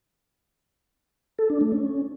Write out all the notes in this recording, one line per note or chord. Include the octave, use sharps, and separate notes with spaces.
A4
D4
A3
C#4